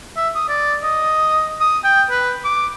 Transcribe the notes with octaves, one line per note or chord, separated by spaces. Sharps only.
E5
D#6
D5
D#5
D#6
G5
B4
D6